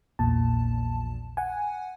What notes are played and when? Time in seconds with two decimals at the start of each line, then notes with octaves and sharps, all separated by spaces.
0.19 A#1 E2 A#2 A5
1.37 F#5 G#5